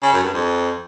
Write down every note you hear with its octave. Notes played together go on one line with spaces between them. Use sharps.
C#3
F#2
G2
F2